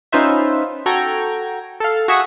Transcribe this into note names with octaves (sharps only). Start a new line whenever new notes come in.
C#4 D#4 F4 B4 C5 E5
F#4 A4 G5 A#5 G#6
A4 F5
F#4 G#4 E5 C#6 D#6